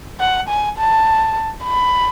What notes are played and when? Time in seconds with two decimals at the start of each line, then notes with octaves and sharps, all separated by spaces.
0.20 F#5
0.49 G#5
0.78 A5
1.63 B5